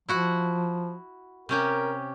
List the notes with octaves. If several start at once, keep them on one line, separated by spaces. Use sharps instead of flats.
F3 E4 F#4 F#5
C3 C#4 G4 A#4